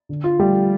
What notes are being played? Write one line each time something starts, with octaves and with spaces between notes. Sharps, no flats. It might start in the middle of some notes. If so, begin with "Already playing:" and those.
D3
F4
F3 G3 A3 G4